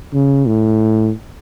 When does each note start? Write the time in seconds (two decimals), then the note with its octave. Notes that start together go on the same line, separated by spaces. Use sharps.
0.13 C#3
0.47 A2